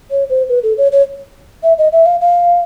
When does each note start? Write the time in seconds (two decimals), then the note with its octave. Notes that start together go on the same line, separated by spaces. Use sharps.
0.11 C#5
0.30 C5
0.49 B4
0.63 A4
0.78 C#5
0.92 C#5
1.63 E5
1.78 D#5
1.92 E5
2.06 F5
2.21 F5